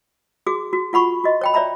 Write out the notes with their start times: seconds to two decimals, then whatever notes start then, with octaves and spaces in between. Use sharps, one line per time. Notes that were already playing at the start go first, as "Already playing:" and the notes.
0.46 F#4 G#4 D6
0.73 F#4
0.93 F4 F#5 B5 C#6
1.24 F#4 D#5
1.41 C#5 G5 B5
1.54 C#5 D5 E5 A#5 B5